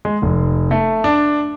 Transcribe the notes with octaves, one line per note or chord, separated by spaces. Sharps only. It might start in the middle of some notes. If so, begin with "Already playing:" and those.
G#3
F1
A3
D4